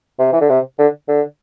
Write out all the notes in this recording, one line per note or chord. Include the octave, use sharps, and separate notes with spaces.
C3
E3
D3
C3
D3
D3